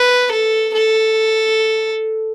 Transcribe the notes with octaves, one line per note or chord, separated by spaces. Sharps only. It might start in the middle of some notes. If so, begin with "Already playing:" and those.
Already playing: B4
A4
A4